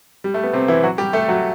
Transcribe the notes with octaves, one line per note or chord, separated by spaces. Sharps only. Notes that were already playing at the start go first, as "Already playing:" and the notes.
G3
A3
B3
C3 C4
E3 E4
F#3 F#4
G3 G4
A3 A4
F#3 F#4